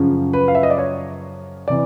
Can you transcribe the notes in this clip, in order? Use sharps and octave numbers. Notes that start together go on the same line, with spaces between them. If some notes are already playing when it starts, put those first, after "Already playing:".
Already playing: F#2 C#3 F3
B4
F5
E5
D#5
D5
C#5
C3 E3 D5